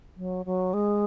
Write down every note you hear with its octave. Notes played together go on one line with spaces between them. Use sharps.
F#3
F#3
G#3